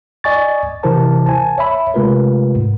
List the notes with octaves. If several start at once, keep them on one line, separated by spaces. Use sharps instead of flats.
D5 D#5 G#5 C#6 A6
C3 E3 E4 A#4 C5 A5
G#5 A5
C#5 E5 B5
C3 G#3 A3 F4 A#4 B4
G#2